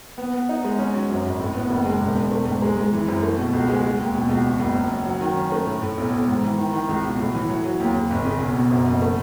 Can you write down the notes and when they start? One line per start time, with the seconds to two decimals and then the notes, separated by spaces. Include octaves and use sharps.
0.18 B3
0.34 B3
0.49 D#4
0.65 G#3
0.79 C#4
0.94 F#3
1.10 F#2
1.25 G#1
1.39 A2
1.55 B3
1.70 F#1
1.86 G#3
2.01 E1
2.16 E1
2.31 A3
2.47 G#2
2.62 G#3
2.77 G#3
2.93 E3
3.08 F#2
3.23 A3
3.37 B2
3.53 C#2
3.69 G#3
3.84 G#3
4.00 D#2
4.15 B2
4.29 C#2
4.44 E2
4.60 F#1
4.75 F#2
4.91 F#3
5.05 F#3
5.21 D#3
5.36 C#4
5.52 A3
5.66 A2
5.82 A2
5.97 B1
6.12 B1
6.28 G#2
6.43 E3
6.58 D#3
6.72 D#3
6.88 C#2
7.03 B2
7.19 A2
7.35 E3
7.49 F#3
7.65 F#3
7.80 D#2
7.95 C#3
8.11 G#1
8.25 C#3
8.41 B1
8.56 B2
8.71 F#2
8.86 F#1
9.02 A3